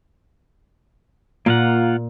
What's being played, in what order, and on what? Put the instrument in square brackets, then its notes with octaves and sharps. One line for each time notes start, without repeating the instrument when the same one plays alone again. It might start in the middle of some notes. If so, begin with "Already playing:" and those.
[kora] A#2 [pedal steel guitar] A#3 F4 F#5